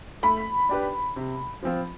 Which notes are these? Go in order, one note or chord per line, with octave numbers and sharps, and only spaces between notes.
A3 B5
D4 G4 B4
C3
F3 C4 F4